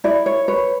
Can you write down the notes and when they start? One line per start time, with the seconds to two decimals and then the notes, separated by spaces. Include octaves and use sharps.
0.04 E4 D5
0.26 C#5
0.48 B4 C#5